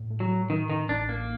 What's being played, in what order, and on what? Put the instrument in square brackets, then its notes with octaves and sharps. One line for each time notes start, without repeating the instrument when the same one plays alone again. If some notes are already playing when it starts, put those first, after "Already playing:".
Already playing: [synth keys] A2
A3
[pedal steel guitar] F#3
[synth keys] A3
[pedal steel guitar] D#3 [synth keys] D#4
[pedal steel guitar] D#3 [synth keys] D#4
[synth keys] A1 [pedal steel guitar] D4
[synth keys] A1 [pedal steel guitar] A#3